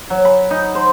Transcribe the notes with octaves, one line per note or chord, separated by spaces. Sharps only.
F#3
B5
D#4
C5